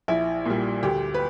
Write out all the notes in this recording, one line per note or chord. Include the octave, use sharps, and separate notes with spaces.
A#1 E4
A#2 G3
D2 G4
B4